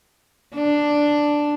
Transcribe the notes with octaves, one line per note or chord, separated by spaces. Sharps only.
D4